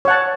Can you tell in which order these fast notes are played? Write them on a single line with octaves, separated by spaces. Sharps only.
C#5 F#5 A5